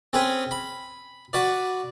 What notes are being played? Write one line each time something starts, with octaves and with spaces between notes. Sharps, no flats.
C4 C#4 G#4 B4
B5
F#4 B4 D5